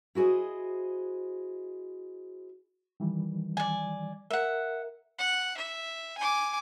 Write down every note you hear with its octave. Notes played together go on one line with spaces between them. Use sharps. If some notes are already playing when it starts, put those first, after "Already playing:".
E4 F#4 G#4 C5 D#5
D#3 E3 G3
D5 G#5
A#4 E5 F#5
F#5
E5
G#5 D6